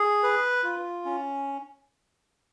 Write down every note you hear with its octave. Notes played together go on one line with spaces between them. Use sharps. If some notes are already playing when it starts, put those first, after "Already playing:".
Already playing: G#4
B4
F4
C#4